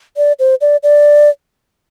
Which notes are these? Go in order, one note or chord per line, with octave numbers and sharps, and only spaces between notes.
D5
C5
D5
D5